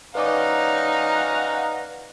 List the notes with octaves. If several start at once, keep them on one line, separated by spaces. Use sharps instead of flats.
C#4 D#4 B4 D5 F5 F#5 A#5 D6